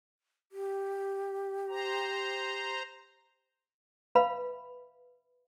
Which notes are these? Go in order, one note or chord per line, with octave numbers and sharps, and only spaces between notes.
G4
C5 A#5
B4 E5 F5 B5